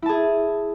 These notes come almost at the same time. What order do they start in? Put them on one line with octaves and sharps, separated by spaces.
E4 A5 G#4